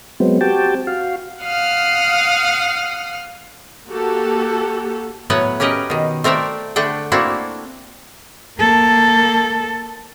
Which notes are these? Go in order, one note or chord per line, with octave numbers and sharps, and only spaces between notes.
F#3 G#3 B3 C4
C4 F#4 G4 G5 A5
F#4 F5
F5 F#5 D#6 F6
A#3 F#4 G4 A4
A2 F#3 B3 B4 C#5 F#5
C#4 G4 A#4 B4 D#5
B2 D#3
A3 C4 A#4 D5 E5
D3 A3 D4 F#5 G5
A3 A#3 C4 D4 E4 F#4
A#3 A4